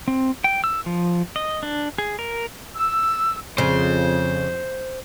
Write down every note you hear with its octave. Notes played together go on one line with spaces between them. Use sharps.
C4
G5
E6
F3
D#5
D4
G#4
A#4
E6
F2 C#3 C5